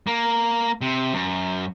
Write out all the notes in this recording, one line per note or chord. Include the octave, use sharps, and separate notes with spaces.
A#3
C3
F#2